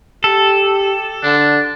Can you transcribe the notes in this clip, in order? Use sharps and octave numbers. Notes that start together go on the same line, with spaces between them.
G4 A4
D3 D4